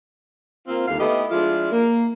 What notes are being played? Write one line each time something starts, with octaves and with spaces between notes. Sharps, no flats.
A#3 C4 F4
D#2 D3 G3 F5
A3 B3 E4 G4 A4 D#5
F3 G#3 D4 E4 F4
A#3